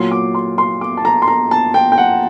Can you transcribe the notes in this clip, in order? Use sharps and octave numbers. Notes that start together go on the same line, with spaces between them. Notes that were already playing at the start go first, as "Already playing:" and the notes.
Already playing: A#2 F#3 C6
D6
C6
C6
D6
A5
A#5
C6
A#5
A5
G5
G5
F#5